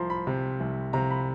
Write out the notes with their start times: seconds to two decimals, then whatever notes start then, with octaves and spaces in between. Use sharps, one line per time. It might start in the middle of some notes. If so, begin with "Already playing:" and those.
Already playing: C2 F3 A#5 C6
0.10 B5
0.27 C3
0.60 C2
0.93 C3 A#5
1.11 B5